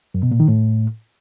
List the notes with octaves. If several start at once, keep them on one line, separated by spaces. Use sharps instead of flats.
F#2
B2
A#2
D#3
A2